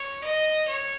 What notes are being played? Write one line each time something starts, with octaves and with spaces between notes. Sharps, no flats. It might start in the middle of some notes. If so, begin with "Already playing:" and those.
Already playing: C#5
D#5
C#5